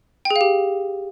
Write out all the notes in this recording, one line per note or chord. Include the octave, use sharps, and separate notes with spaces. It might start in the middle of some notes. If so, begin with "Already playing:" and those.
G5
G#4
F5
G4